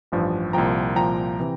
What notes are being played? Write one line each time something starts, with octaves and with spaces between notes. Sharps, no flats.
A1 G2 F3
C2 A#2 F3 G5 A#5
C2 A#2 F3 G5 A#5
C3 E3